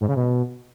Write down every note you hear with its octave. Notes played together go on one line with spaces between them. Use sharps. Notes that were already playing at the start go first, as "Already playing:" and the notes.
G#2
C#3
B2